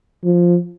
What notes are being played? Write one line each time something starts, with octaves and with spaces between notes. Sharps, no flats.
F3